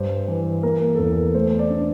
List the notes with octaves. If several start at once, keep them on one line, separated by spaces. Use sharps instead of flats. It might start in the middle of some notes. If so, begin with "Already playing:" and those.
Already playing: G2 C5
E3
A#3 A#4
A4
E2 A#4
A3 C5
D5
D4